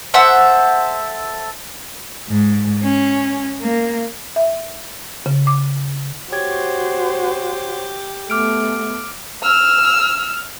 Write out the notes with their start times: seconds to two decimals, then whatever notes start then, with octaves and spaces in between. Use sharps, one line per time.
0.14 A4 C5 E5 F#5
2.28 G#2
2.81 C#4
3.59 A#3
4.36 E5
5.26 C#3
5.47 D6
6.32 F#4 G4 C5 C#5 G#6
8.30 A3 B3 D6 F6 D7
9.43 E6 F6